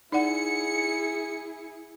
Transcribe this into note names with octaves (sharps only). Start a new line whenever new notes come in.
D#4 E4 G#4 D5 F#5 C#7